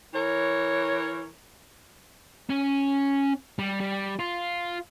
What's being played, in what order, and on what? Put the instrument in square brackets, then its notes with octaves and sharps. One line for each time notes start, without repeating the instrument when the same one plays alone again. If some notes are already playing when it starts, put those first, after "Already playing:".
[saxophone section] E3 A#4 C#5
[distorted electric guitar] C#4
G3
G3
F4